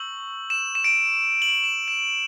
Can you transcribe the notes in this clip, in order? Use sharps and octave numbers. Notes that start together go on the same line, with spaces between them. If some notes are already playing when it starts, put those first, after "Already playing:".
Already playing: C#6 E6 G6 F#7
E7
E7
D7
F#7
E7
E7